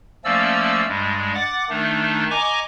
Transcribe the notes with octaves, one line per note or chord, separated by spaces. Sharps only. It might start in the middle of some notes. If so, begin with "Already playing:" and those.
F3 A3 A#3 C#4 D5 E6
G2 G3 G#3
F#5 D6 A6
D#3 A3 D4 D#4
D#5 G#5 A#5 C#6 D6